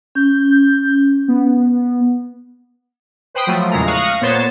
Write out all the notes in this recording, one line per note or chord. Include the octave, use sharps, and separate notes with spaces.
C#4 G6
B3
B4 C5 G5 B5 D#6
F3 F#3 A3
E2 A#2 C#3 G#3 A3 A#5
F5 C#6 D#6 F#6 A#6
A#2 B3 C5 C#5 A6 E7